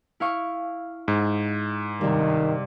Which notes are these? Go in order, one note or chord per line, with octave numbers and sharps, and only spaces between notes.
E4 F5 C#6
G#2
G2 C3 D#3